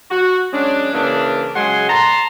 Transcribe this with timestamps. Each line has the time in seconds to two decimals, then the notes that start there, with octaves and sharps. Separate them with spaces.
0.11 F#4
0.53 F#3 G#3 C#4 D4
0.93 C#3 E3 A#3 C#4 D4
1.56 C#3 F#3 G#3 F#5 G#5 C6
1.89 A5 A#5 C6